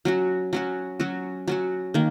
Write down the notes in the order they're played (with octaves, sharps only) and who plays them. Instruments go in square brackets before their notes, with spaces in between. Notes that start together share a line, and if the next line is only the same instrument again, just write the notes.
[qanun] F#3 C#4 F#4
F#3 C#4 F#4
F#3 C#4 F#4
F#3 C#4 F#4
D#3 A#3